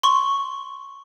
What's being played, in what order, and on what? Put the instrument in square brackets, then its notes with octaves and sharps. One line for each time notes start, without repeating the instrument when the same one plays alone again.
[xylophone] C6 C#6